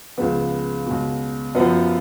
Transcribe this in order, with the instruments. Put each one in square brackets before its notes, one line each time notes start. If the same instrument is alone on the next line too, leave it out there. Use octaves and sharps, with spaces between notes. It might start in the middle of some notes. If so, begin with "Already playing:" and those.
[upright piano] C#2 C#3 F3 B3
C#2 B2
F#2 F3 B3